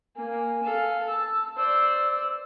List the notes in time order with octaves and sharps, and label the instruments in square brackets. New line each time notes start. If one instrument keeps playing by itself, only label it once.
[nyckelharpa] A#3 [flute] G#5
[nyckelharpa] A4 F5
[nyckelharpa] A5 [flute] E6
[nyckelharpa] C5 D5 [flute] E6